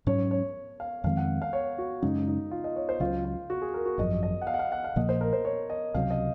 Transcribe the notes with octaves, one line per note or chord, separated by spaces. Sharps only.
G#2 F#3 C#4 C#5
C#5
F5
F2 D#3 G#3 C4 F5
F#5
F5
C#5
F#4
F#2 C#3 G#3 C#4 D#4
D#4
F4
D#5
C#5
C5
C#2 C#3 F#3 F4
F4
F#4
G#4
A#4
F#4
G#1 F#2 F3 D#5
D#5
F#5
F5
F#5
F5
F#5
F5
A#1 A#2 F3 A#3 D#5
C5
A#4
C5
C#5
D#5
C#2 C3 F#3 F5
D#5